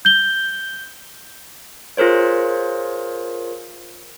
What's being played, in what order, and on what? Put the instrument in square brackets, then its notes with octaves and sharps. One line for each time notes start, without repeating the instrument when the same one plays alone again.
[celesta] G6 G7
[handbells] F4 G#4 A#4 C5 C#5